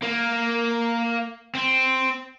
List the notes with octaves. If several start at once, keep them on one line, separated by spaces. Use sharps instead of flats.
A#3
C4